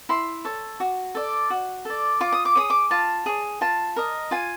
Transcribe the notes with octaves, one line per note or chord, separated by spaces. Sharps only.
E4 C6
A4 C#5
F#4
A4 D5
F#4
A4 D5
F4 D6
D#6
D6
G#4 C#5 D#6
D6
F4 A5
G#4 C#5
F4 A5
A#4 D#5
F4 G#5